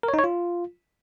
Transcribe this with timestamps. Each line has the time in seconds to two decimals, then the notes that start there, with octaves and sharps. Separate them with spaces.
0.03 A#4
0.09 C#5
0.14 D#4
0.19 C#5
0.24 F4